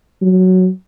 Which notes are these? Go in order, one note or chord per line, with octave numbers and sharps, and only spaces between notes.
F#3